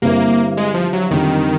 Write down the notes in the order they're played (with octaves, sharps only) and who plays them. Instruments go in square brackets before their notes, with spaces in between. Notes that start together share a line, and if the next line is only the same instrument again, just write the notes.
[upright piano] G2 D3 G3 C4 E4 [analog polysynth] A#3
[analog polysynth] G#3
F3
F#3
[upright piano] F2 D3 G3 [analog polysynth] D#3